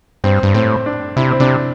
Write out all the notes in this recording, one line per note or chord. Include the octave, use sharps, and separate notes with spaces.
G2 C4
G2
A2 C4
D4
C3 E4
C4
C3 D4